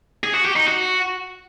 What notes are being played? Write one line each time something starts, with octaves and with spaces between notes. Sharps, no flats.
G#4
F#4
G4
D#4
F#4